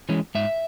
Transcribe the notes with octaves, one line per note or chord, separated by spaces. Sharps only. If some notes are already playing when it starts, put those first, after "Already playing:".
E3 G#3 C#4
G#2 E5